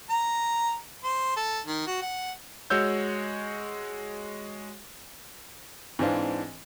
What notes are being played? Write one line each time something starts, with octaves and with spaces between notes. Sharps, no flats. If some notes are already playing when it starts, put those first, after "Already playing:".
A#5
C5
A4
D#3
F#4
F#5
G#3 F#4 C#5 E6 G6
G#2 E3 C4 D4 F5